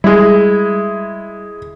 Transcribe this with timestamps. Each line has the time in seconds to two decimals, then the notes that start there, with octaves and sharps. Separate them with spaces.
0.04 G3 G#3 E4